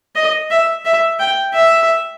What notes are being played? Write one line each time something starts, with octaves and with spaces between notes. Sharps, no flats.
D#5
E5
E5
G5
E5